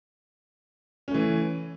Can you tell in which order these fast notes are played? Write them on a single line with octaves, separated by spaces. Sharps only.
C#4 A3 E3